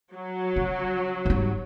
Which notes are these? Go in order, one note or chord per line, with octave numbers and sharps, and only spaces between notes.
F#3
C#3
G#2 G3